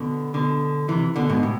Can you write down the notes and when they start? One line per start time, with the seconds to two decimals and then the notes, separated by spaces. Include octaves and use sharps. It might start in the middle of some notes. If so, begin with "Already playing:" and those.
Already playing: B2 D3
0.34 B2 D3
0.88 C3 E3
1.16 B2 D3
1.29 G#2 B2
1.43 A2